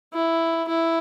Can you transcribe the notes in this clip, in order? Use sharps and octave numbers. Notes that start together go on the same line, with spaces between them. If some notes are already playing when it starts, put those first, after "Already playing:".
E4
E4